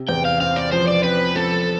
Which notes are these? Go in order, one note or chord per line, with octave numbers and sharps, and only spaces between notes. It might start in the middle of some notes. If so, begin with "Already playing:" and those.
Already playing: C3
E2 G5
F5
C4 F5
D5
F3 C5
D5
C4 B4
F3 A4